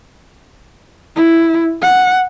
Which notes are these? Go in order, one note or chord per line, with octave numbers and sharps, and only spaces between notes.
E4
F#5